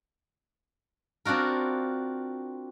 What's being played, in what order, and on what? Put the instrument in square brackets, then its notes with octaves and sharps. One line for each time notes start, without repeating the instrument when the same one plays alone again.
[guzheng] C4 D4 F4 F#4 A#4